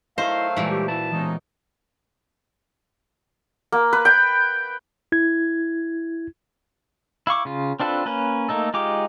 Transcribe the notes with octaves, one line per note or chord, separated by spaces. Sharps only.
D#3 F#3 A3 E4 C5 D#5 F5
A#2 E3 G3 G#3
G4
E4 F#4 B4 A5
C3 E3 G#3 B3 C#4 D#4
A#3
B4
G5
E4 G#6
E4 F5 C#6 D6
C#3 F4
C4 D4 F4 A4 B4
A#3 C#4 B4
A3 A#3 D#4 A4
G#3 D#4 F4 G4 D6